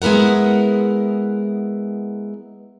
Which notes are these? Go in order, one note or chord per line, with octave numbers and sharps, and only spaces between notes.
G#3 B3 E4 A#4 F#5